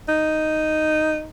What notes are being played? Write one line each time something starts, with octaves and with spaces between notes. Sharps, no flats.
D#4